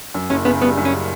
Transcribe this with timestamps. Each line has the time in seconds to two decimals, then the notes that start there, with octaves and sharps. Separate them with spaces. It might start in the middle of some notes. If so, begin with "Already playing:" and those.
0.14 F#2
0.30 F#1 C#4
0.45 C#3 B3
0.61 G3 B3
0.77 F#2
0.85 C#4